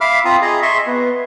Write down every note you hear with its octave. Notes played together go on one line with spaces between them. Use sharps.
E5 F5 B5 D6 F6
C4 F4 A#5 D#6
G#4 D#5 A#5
D#5 E5 C6 C#6
B3